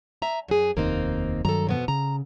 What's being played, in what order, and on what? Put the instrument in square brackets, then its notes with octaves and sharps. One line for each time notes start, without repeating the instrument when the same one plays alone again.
[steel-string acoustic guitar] E5 G#5 A#5
F#2 G#4
[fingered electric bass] F1 D#2 [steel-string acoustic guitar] A#3 C4 D#4
[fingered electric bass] G2 D#3 F#3 [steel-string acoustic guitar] A4 A#5
[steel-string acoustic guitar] F2 B2 B3
[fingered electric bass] C#3 [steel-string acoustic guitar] A#5